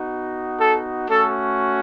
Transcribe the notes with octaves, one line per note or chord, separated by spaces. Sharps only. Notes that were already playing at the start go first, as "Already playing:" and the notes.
Already playing: B3 D#4 F#4
A4
A3 C#4 F#4 A4